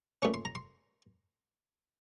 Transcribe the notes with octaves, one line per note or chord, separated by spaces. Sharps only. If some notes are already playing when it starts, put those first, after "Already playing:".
A#2 A3 C#4 C#6
C6
A#5
C6